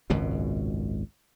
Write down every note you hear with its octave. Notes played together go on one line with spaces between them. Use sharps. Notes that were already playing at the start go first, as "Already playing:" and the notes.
G#1 C#2 F#2 B2